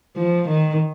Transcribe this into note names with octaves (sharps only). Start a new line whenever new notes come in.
F3
D#3